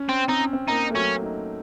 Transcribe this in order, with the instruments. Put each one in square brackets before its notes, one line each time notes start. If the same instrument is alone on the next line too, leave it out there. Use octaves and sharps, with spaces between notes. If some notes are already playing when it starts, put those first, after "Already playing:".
Already playing: [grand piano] C#4
[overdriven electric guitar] C4
[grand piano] C4 [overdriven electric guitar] D#4
[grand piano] C#4
C4
[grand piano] A#3 [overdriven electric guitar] D#4
[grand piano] A3
[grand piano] F#3 [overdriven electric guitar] C#4
[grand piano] D#4